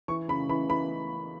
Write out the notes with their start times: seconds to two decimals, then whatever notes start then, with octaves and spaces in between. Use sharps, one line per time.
0.08 E3 C#6
0.28 C#3 B5
0.49 E3 B5
0.69 E3 B5